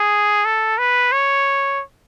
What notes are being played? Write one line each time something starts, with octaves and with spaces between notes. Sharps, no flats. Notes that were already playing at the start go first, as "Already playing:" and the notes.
Already playing: G#4
A4
B4
C#5